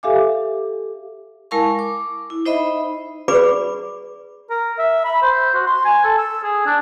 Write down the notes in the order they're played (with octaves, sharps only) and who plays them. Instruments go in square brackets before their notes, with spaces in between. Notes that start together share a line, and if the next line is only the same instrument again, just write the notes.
[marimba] G4 A4 E5 F5 G#5 D6
[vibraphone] G#3 E4 A#4 F5 A5 C#6
D6
E4
D#4 C5 D#5 E5 B5
[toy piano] G#4 B4 D5 B5 D6
[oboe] A#4
E5
B5
C5
F#4
C6
G#5
A4
E6
G#4
D4